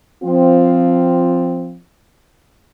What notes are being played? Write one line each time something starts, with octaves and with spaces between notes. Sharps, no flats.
F3 C4 F4